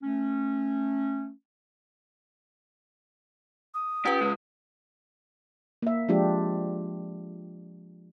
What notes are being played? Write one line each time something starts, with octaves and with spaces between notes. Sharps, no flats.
A3 C#4
D#6
C#4 F4 G4 B4
C#3 G#3
A#3 E5
F3 G#3 D4 F4 G4